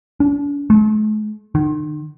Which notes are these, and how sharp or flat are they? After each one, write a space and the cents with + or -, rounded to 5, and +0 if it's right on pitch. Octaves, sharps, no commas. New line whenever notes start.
D4 -40
A3 -45
D#3 -45